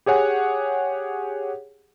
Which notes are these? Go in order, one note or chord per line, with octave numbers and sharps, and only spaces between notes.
G4 G#4 C#5 F#5 G#5